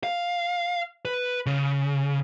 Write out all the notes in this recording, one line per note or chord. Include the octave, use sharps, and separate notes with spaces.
F5
B4
C#3